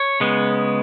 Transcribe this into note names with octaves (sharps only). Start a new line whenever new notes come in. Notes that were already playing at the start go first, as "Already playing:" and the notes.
Already playing: C#5
C#3 G#3 B3